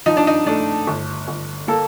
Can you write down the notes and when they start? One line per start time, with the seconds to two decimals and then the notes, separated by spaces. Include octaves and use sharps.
0.06 F3 D#4
0.17 D4
0.27 D#4
0.47 A3 D4
0.87 G1
1.28 G1
1.68 A#3 A4